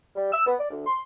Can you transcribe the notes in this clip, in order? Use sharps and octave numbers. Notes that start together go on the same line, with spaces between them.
G3
E6
B3
D5
D2
C6